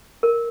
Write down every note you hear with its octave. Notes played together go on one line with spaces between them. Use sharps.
A#4